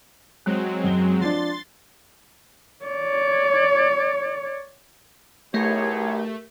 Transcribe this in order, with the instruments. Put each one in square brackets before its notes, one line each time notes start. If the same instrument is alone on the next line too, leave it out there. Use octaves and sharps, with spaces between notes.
[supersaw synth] F#3 G#3 C4 [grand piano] F#6
[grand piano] F#2 G7
[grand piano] F3 D4 [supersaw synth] C6 A6
[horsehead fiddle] C#5 D5
[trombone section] B1 [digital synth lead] A3 [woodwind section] E4 G#4 C#5 [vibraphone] G4 A#4